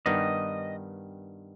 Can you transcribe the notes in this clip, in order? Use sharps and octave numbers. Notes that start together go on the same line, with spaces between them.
G2 D#3 G3 B3 D#4 D#5